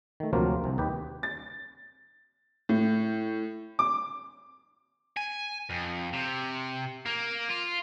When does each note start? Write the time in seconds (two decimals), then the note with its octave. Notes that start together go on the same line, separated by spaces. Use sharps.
0.20 D#3 A3
0.33 D2 C3 F3 F#3 A#3 F4
0.64 C2 C3
0.78 D#2 G4 B4 D#5
1.23 A6
2.69 A2
3.79 D6
5.17 G#5
5.70 F2
6.13 C3
7.06 A#3
7.49 F4